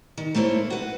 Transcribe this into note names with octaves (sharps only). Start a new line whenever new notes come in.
D#3
A3 A#3 E4 C5 C#5
F#4 B4